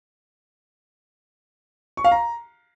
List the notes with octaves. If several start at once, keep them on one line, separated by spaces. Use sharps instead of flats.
C#6
F5
A#5